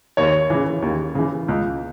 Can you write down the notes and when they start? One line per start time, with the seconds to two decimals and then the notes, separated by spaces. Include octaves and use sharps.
0.17 D#2 C#5
0.50 C#3 E3
0.82 D#2
1.15 C#3 E3
1.48 C#2